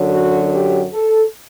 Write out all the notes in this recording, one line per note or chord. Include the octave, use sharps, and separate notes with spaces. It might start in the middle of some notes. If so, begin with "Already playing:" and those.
Already playing: F#2 D3 F#3
F#4
G4
A4